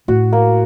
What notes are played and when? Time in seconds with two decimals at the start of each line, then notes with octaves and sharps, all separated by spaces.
0.08 A2 F#4
0.33 A#3